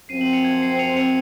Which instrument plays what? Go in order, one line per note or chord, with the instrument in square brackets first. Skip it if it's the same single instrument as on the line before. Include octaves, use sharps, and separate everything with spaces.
[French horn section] F#2 F3 C4 [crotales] C7 D#7
[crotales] D#7 F#7
C#7 F7
G#6
C7
C#7 F7
C#7 F7